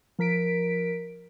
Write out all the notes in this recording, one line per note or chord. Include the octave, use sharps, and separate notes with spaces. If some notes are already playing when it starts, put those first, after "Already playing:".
F3 A#4 B6 D7